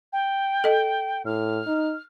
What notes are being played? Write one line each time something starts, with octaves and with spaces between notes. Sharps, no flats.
G5
A4 D#5
A2 F6
D#4